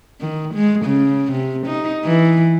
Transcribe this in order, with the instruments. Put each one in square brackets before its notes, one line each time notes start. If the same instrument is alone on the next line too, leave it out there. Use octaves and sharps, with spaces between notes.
[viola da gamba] D#3
G#3
C#3
C3
D#4
E3